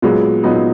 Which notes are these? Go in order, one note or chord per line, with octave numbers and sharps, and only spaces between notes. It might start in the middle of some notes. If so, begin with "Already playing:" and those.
A#2 F#3 G#3 B3
A#2 F#3 B3 D#4